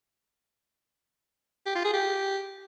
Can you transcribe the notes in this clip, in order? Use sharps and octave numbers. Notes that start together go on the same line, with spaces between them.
G4
F4
G#4
G4